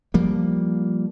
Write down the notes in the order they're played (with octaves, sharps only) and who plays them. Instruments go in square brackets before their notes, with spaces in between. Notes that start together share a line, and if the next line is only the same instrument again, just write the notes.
[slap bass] F3 G3 A#3